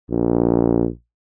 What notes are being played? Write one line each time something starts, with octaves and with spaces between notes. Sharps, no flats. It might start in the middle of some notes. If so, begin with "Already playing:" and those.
A#1